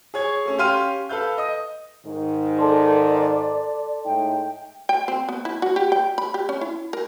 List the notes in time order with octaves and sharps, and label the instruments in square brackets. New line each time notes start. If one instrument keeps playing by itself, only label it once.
[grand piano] G#4 C#5 G#6
A3 C#4
C#4 G4 F5 C6 F6 D#7
A4 B4 F5 G6
D#5 D#6
[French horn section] G#2 D#3
[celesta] A4 A5 C6 [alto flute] D5
[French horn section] A2 G#3 D#4 [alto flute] G5
[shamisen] G5
C4
B3
E4
F#4
G4
G5
B5
G4
C#4
E4
A#4